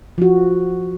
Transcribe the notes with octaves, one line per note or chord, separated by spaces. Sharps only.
F3 F#4